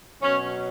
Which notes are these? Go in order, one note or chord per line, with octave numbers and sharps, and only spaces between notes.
B2 F#3 C#4